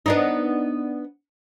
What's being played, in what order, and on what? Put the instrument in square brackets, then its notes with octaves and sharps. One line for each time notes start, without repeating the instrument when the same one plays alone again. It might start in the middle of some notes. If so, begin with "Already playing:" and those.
[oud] B3 D4 D#4